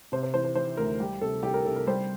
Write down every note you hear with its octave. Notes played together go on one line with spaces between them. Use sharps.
C3 C5
C5
E3 C5
C5
E3 C5
D2 A#4
G3 G4
C3 A4
C2 G4
A#4
C3 A4
A#4
G3 C5